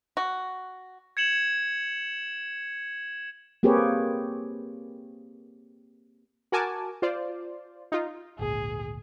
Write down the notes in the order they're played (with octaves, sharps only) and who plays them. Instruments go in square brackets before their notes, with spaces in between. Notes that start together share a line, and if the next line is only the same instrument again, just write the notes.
[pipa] F#4
[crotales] G#6 C#7 E7 F#7
[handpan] A#3 C4 G4 G#4 B4 C#5
[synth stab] F#4 A#4 G#5 A5 D6
F4 C5 D5
D#4 F4
[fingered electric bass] G#1 D2 A#2 [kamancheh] G#4